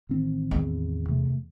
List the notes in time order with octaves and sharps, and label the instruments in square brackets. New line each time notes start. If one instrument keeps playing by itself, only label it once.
[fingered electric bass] A1 D#3 C4
[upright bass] E2
[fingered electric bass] C3 A3